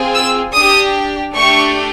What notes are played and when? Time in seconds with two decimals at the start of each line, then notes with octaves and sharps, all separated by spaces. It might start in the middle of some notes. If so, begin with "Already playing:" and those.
Already playing: C4 F4 G#4
0.14 E6
0.54 D4 G4 D#6
1.35 A3 D4 G4 C#6